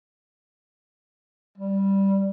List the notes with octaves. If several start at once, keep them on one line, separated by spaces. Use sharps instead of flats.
G3